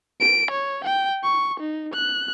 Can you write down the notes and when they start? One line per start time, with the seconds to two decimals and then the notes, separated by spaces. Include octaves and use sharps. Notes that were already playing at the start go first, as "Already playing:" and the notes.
0.21 D7
0.51 C#5
0.85 G5
1.24 C#6
1.60 D#4
1.94 F#6